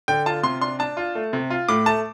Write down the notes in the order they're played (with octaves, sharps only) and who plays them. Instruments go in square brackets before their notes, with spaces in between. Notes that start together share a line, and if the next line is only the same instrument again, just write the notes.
[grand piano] D3 G5
F4 A5
C3 C6
D4 C6
D4 A5
F4
A3
C3
F4
A2 D6
A3 A5